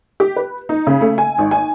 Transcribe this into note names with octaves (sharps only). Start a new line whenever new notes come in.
G4
B4
D#4
C#3
A3
G#5
G#1
G#5